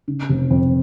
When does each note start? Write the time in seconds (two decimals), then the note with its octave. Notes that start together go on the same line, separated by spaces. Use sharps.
0.08 C#3
0.29 F1
0.51 F2